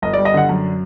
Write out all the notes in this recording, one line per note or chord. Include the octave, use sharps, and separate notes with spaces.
G1 D#5
G3 D5
D#5
D3 F#5
F#2